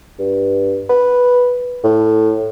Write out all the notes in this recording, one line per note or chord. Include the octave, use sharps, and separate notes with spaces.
G2
B4
A2